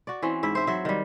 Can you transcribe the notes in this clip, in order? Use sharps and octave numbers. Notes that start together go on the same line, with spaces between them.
F#4 D5
E3 C4 C#4
G#2 E4 E5
C5 E5
F#3 E5
D#3 G3